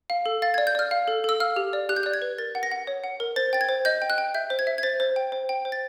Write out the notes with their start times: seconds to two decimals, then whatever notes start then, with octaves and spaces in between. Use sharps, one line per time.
0.10 F5
0.26 A4
0.42 F5 A6
0.54 D5 G#6
0.67 G6
0.75 D5 F6
0.91 F5
1.08 A4
1.24 A4 E6
1.40 F5 F6
1.56 G4
1.73 D5
1.89 G4 F#6
1.96 G6
2.03 D5 F#6
2.14 G#6
2.22 B4
2.38 A#4 A6
2.55 F#5
2.63 A#6
2.71 F#5
2.87 C#5
3.04 F#5
3.20 A#4
3.36 C5 A6
3.53 G5 A6
3.61 G#6
3.69 C5
3.85 D#5 G6
4.02 G5
4.10 F#6
4.18 G5
4.34 E5 G6
4.50 C5
4.59 G#6
4.67 E5
4.78 G#6
4.83 C5 A6
5.00 C5
5.16 G5
5.32 C5
5.49 G5
5.65 C5
5.72 A6